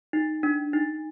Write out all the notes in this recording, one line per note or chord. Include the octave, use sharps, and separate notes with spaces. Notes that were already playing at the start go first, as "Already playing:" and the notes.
D#4
D4
D#4